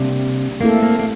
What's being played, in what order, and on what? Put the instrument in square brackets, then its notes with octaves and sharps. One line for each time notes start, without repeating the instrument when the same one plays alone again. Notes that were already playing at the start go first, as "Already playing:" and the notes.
Already playing: [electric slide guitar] C3 [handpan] G3 A#3 D4 G4
[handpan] A3 C4 E4 A4 [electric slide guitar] A#3
[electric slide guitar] A#3
A#3